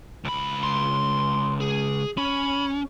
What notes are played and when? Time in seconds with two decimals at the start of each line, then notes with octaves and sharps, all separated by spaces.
0.24 C#2 B5
0.63 C6
1.60 G#4
2.18 C#4 B5